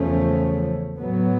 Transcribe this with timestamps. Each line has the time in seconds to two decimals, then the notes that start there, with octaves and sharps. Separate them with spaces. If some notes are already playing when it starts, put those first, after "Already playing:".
Already playing: E2 C#3 F3 A3 C#4
0.99 A2 F#3 B3